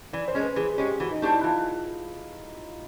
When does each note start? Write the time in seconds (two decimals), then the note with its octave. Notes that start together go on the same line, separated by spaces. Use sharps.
0.13 E3 D5
0.28 C5
0.35 G#3 C#4
0.42 B4
0.56 E3 G#4
0.78 G#3 C#4 G4
1.00 E3 F#4
1.11 D#4
1.22 A3 D4 E4 G4 C5
1.33 E4
1.44 E3 F4